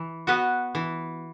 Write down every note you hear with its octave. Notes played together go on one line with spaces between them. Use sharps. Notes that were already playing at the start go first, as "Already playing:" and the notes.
Already playing: E3
B3 F#4 B4 D#5
E3